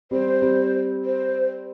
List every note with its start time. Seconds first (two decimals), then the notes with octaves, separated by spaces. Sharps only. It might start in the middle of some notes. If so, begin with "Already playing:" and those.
0.11 G3 C4 C5
0.42 G3 C4
1.05 C5